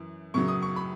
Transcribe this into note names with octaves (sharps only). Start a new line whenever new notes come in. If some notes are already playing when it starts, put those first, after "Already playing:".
Already playing: F#2 E3
F#2 C#3 F#3 C#6
D#6
C#6
B5